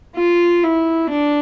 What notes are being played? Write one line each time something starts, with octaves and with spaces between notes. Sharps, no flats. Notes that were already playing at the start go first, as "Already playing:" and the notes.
F4
E4
D4